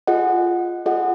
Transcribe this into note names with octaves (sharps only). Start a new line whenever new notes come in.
F4 G#4 D#5 F#5
F4 G#4 D#5 F#5